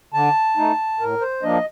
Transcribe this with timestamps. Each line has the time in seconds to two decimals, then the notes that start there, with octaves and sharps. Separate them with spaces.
0.14 D3 A5
0.57 A3 D#4
1.00 A2 A#4
1.21 C5
1.43 F3 A#3 D4 D#5